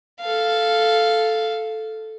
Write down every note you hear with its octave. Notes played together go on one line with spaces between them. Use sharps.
A4 F5